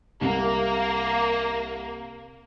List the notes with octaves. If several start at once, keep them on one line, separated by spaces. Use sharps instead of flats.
C2 A#3